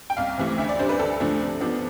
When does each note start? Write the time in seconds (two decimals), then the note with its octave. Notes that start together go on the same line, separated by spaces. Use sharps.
0.10 G5
0.17 C2 F5
0.37 C3 E3 A3
0.58 D2 E5
0.69 D5
0.79 C3 G3 D4 C5
0.89 B4
0.99 D2 A4
1.20 D3 F3 A3
1.41 C3
1.61 F3 B3 D4